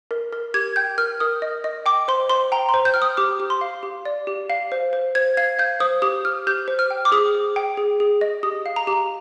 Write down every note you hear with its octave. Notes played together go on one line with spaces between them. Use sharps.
A#4
A#4
G4 G#6
G5 G6
A#4 F6
A#4 D#6
D#5
D#5
G5 D6
C5 C6
C5 C6
G5 A#5
C6
C5
G6
G5 F6
D#6
G4 D6
G4
C6
F5
G4
D5
G4
F5
C5
C5
C5 G#6
F5 G#6
F5 G6
C5 D#6
G4 D#6
G4 F6
G4 G6
C5
F6
G5
D6
G#4 D#6
G#4
G5
G#4
G#4
D#5
G4 D#6
F5
A#5
G4